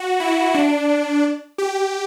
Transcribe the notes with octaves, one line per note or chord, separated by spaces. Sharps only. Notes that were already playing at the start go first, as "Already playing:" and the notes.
Already playing: F#4
E4
D4
G4